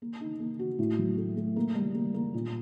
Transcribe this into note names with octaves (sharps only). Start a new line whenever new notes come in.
A#3
D#4
A#3
F#4
A2
F#3
A3
A3
A#3
G3
A#3
A#3
A#2